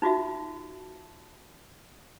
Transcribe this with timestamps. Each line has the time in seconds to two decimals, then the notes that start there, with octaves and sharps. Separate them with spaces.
0.02 D#4 F4 F#4 E5